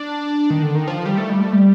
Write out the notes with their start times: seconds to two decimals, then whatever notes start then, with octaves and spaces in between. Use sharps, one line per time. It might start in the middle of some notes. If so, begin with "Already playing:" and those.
Already playing: D4
0.50 D#3
0.62 D3
0.75 D#3
0.88 F3
1.06 G3
1.17 A3
1.30 G3
1.41 A3
1.53 G3